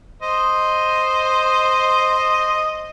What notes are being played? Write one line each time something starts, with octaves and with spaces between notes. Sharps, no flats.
C5 D#5